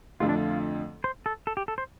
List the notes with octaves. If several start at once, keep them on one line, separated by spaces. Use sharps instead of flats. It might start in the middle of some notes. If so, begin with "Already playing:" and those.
F2 D3 F3 A3 F4
D4
F4
C5
A4
A4
G4
A4
C5